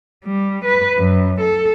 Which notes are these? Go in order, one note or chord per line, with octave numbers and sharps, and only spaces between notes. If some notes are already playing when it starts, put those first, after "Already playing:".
G3
B4
F#2
A4